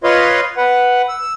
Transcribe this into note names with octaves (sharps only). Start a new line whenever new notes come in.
F4 B4 C#5 D#5 F5 C6
B4 F#5
E6